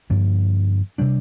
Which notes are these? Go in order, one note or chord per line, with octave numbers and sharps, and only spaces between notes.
G2 D3 F3 A#3
C3 G3 D4